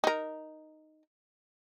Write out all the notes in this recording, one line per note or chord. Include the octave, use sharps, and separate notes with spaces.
D#4 A#4